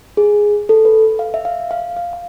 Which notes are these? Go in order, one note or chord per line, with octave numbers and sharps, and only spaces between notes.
G#4
A4
B4
F5
E5
F5
F5
F5
F5